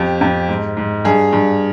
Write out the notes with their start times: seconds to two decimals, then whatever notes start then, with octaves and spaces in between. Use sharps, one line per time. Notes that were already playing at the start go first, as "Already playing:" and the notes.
Already playing: F2 G4
0.21 F2
0.49 G#2
0.77 G#2
1.05 G2 G#4
1.33 G2